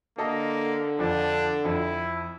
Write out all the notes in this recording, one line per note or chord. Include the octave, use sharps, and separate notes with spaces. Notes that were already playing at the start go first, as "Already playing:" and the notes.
D3 A#3 A4 D#5
F2 F3 D4
F2 E4